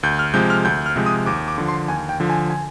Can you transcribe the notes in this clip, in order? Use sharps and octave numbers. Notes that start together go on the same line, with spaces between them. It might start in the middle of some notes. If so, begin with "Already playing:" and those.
D2 G6
F6
C3 F3 G#3 G6
F6
D2 G6
F6
C3 F3 G#3
D#6
D#2 D6
D6
D3 F3
C6
D#2 G#5
G5
D3 F3
G#5
G#5